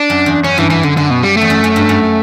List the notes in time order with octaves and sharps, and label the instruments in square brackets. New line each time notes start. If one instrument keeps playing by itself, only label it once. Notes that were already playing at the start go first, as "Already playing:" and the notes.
Already playing: [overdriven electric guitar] D4
[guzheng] F#2
E2
[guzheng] F#2 [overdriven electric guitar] C#4
[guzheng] G2 [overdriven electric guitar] E3
[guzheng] F#2 [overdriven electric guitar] E3
[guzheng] F#2 [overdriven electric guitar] D3
[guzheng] F#2 [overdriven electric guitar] D3
[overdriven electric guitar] B2
G3
[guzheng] E2 [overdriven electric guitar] A3
[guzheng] F#2
F#2
G2
F#2